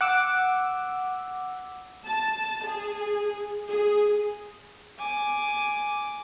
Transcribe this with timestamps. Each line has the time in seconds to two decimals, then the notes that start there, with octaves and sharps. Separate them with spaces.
0.01 F#5 D6 E6
2.05 A5
2.65 G#4
3.67 G#4
4.98 G#5 D6